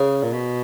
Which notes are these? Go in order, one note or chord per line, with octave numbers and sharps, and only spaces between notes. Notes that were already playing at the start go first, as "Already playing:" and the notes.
Already playing: C#3
A#2
B2